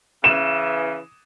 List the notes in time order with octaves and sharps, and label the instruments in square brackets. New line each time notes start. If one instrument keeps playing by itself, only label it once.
[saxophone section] C#3 E3 [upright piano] E7